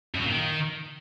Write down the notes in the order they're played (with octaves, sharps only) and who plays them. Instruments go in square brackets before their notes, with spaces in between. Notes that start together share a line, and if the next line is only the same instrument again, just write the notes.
[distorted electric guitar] F#2
F#3
A#2
D#3